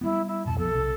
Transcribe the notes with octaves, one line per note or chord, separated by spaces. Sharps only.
G3 G#3 B3 E4
E4
D1 F2 B2 A5
B1 F3 B3 A4
B1 C3